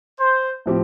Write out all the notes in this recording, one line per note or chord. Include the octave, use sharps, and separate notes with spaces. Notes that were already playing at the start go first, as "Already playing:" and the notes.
C5
A2 F3 C4 G4